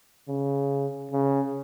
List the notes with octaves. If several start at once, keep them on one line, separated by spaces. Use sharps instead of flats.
C#3
C#3